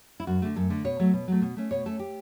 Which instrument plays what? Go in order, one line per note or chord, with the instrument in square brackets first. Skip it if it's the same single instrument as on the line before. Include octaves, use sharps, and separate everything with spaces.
[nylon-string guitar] E4
F#2 F#4
D3 A3
F#2 A4
D3 A3
B2 C#5
F#3 A3
B2
F#3 A3
B2
A3 C#4
B2 C#5
A3 C#4 A4
G4